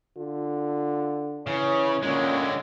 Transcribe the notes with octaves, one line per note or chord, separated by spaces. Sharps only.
D3 F4
C#3 E3 C#5
A#2 D3 G#3 C#4